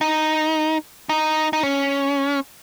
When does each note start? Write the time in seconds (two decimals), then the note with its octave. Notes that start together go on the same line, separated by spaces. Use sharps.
0.01 D#4
1.09 D#4
1.53 D#4
1.63 C#4